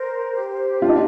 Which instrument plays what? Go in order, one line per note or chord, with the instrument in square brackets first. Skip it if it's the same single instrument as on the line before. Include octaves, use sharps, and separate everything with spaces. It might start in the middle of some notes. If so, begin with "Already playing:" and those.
Already playing: [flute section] A#4 C5
G4
[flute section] D4 [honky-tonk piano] F4
[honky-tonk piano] D#4